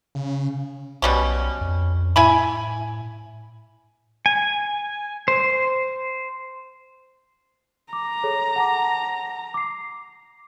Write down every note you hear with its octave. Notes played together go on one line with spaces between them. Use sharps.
C#3
B1 B2 G3 C#4
F2
A2 E4 G#5 B5
G#5
C5
A#5 D6
G#4 A4 C#5
F#5 A5 D6
D6 C7